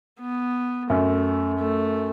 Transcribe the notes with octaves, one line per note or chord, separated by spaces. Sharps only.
B3
F#2 A3
A3